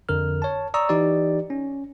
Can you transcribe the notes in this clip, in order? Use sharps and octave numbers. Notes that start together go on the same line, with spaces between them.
F2 D3 A#4 F6
C#5 A5
D5 A#5 C#6 D#6 E6
E3 D#4 G4 D5
C#4